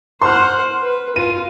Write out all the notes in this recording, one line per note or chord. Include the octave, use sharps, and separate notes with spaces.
C5 F#5 C6 F6
B4
F4 D#7